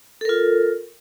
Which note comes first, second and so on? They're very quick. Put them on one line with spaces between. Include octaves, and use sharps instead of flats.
A4 A#4 F4